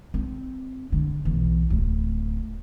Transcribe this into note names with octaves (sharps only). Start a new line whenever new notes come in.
C4
D3
B1 E3
D1